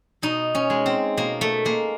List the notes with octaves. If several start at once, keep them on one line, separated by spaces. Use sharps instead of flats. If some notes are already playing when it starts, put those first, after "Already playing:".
B2 D#4
C#4
G#3
C4
B2 A#3
A3
G#3 A#3